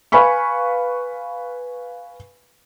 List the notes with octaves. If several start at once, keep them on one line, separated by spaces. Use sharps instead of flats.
B4 F5 G#5 B5 C#6